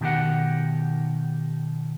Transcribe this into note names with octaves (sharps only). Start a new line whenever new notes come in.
B2 D#3 G4 F#5